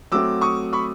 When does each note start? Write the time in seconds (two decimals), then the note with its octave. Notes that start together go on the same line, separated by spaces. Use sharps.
0.12 F#3 A3 C4 D6 E6
0.41 C#6 D#6
0.73 B5 C#6